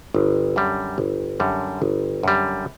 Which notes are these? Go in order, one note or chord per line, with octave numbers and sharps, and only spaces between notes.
G1
F#2 D3 G3
G1
F#2 D3 G3
G1
F#2 D3 G3